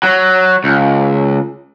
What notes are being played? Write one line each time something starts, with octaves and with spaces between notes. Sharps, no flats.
F#3
C#2